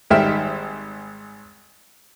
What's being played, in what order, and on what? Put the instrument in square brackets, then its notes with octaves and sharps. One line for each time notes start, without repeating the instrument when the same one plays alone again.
[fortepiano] G#1 D#3 G3 G4 E5 F6